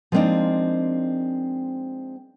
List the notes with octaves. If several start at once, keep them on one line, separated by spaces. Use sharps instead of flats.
F3 G#3 A#3 C4 D4 D#4